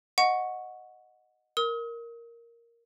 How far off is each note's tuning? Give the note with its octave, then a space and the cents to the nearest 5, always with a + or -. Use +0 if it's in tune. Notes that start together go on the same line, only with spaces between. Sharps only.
D#5 +0 F#5 -15 C#6 +0
A#4 +0 D#6 +40